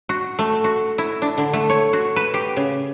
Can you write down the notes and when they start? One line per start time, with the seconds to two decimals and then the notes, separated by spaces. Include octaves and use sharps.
0.09 F#4
0.39 A3
0.64 F#4
0.98 E4
1.22 D4
1.38 D3
1.53 A3
1.70 C#5
1.93 F#4
2.16 B4
2.34 G4
2.57 C#3